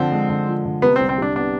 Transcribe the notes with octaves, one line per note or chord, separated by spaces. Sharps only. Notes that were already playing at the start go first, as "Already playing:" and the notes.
Already playing: D3 F3 C4
G#3
D3
F3
D3
C3 B3
C4
C2
C4
G3 D4
B3 D4